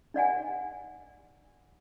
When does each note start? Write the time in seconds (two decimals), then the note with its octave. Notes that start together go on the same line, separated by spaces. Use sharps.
0.14 D#4 D5 F#5 G#5